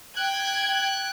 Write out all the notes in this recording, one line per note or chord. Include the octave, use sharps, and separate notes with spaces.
G5 F#6 G#6